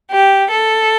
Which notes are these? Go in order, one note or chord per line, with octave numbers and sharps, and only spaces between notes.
G4
A4